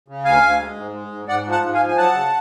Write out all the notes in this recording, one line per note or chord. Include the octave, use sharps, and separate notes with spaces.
C#3
D2 F5 G#5
D2
G#3
G#2
G#3
G#2
G#2 D5 F#5
F3
F#5 A5
G#2
F5 G#5
F3
G#5
F#3 F#5 A5
C#3